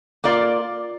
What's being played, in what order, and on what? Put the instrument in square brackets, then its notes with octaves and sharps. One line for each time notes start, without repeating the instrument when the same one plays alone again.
[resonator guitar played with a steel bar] A#3 F4 A#4 D5